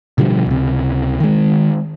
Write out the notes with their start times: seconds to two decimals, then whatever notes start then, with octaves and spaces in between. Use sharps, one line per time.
0.18 B2 D3 F3 G3
0.46 C#2 C3
1.20 D#3 G#3